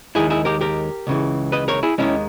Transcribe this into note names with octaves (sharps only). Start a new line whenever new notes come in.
D#2 D#3 G#3 E4 G#4
E4 G#4
G4 A#4
G4 A#4
C#2 C#3 E3
B4 D#5
A#4 C#5
E4 G#4
D#2 D#3 G#3 C#4 E4